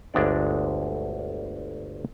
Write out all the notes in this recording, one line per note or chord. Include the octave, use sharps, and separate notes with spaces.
G1 D2 G#3 D4 D5